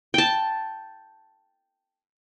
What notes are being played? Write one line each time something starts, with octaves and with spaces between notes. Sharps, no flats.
G5 A5